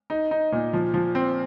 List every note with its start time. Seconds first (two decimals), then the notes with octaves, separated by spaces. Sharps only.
0.10 D#4
0.31 D#4
0.52 A#2
0.73 F3
0.94 F3
1.15 C4